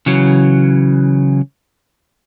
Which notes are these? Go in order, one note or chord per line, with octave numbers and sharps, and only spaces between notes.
C#3 E3 F#3